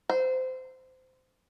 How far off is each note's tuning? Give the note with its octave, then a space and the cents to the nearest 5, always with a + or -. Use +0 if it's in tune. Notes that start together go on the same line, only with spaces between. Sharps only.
C5 -20